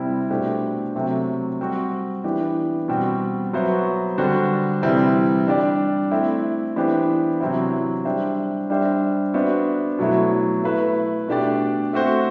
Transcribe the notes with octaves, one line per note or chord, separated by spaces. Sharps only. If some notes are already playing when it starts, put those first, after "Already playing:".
Already playing: C3 G3 C4 E4
B2 A3 D4 G4 C5
C3 F#3 A3 C4
G3 C4 F#4
E3 B3 D4 G4
B2 G3 C4 F#4
F#3 B3 F#4 C5 E5
D3 G3 D4 F#4 C5
C3 E3 G3 C4 E4
G3 D4 G4 D5
A3 C4 E4
E3 B3 D4 G4 C5
C3 F#3 C4 E4
G3 D4 G4 C5 E5
G3 D4 G4 C5 E5
B3 D4 F#4 C5 E5
B2 F#3 A3 E4
A3 E4 B4 E5
B2 A3 D4 G4 D5
A3 C4 F#4 C5